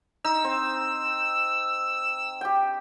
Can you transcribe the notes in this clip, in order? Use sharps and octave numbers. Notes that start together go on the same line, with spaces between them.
D#4 E6
C4
G4 G5